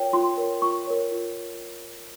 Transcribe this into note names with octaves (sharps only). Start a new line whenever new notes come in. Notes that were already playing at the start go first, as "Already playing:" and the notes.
Already playing: F4 A#4 C#5 G5
F4 C6
A#4 C#5
F4 C#6
A#4 C#5
F4